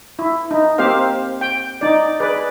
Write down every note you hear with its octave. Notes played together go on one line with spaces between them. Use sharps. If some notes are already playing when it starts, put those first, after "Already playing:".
E4
D#4
A#3 C4 G4 C5 F5
G5
D#4 D5
G#4 B4 D5